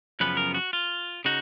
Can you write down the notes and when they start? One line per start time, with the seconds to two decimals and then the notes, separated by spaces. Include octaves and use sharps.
0.20 F#2 C#3 F3 B3 B4
0.37 A#4
0.54 F#4
0.73 F4
1.25 C#3 D#4 F#4